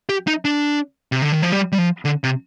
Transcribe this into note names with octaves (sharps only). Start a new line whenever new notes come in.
G4
D#4
D4
C3
D3
D#3
F3
G3
G3
F3
D3
C3